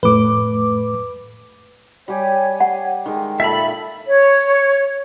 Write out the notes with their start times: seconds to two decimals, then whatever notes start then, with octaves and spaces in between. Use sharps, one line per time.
0.03 F2 A2 A3 B4 D6
2.08 G3 G4 C#5 G#5
2.60 F#5
3.06 D#3 G#3
3.40 A#2 A4 E5 B5
4.07 C#5